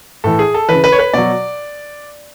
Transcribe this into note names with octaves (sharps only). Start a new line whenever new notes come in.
A2 E3 A4
G#4
A4
C#3 E3 B4
B4
C#5
B4
B2 F#3 D5